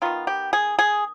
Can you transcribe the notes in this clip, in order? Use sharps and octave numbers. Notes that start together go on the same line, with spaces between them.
D#3 B3 F4
G4
G#4
G#4